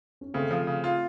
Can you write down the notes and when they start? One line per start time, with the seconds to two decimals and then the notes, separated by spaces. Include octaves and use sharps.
0.21 C#4
0.34 C#3 A3 C4
0.51 F3
0.67 C#3
0.84 F4